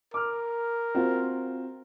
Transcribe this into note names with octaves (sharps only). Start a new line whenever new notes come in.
A#4 D6 F6
C4 F4 F#4